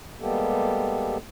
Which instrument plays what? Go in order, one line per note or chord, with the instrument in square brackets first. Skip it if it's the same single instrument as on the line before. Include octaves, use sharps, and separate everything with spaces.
[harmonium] G3 G#3 A#3 B3 G4 A4